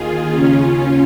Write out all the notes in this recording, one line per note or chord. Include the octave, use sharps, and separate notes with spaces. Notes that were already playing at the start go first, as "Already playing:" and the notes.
Already playing: D#2 D#3 F4 G#4
D#2 C#3 C#4 F4